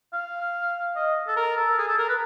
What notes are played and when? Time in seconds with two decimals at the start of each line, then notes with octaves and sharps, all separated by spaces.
0.13 F5
0.96 D#5
1.28 A4
1.36 A#4
1.57 A4
1.78 G#4
1.88 A4
1.98 A#4
2.08 B4